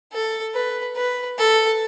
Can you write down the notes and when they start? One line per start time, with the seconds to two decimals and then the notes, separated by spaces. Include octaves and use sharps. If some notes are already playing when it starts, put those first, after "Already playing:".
0.13 A4
0.55 B4
0.96 B4
1.38 A4